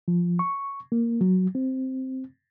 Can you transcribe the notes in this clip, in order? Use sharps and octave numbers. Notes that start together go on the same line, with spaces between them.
F3
C#6
A#3
F#3
C4